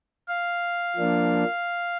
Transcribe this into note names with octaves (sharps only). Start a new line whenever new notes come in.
F5
F3 A#3 D4